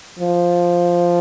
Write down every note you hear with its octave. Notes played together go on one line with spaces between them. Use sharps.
F3